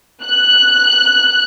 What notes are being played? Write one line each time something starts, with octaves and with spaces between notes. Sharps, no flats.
F#6